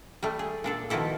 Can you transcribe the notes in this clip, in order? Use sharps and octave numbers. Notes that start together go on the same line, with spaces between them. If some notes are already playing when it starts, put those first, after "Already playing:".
G3 A3
G#4
A#2 D4 A4
B2 D#3 F3 E4 A4